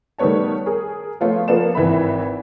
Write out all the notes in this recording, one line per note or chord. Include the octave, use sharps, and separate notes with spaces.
D#3 G3 A3 B3 C#5 A5
G#4 A#4
F3 A3 B3 F4 C#5
F3 A#3 B3 A4 D5 E7
G#1 E3 E5 B5